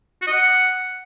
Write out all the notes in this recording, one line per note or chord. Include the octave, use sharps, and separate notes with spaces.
F#4
D#5
F#5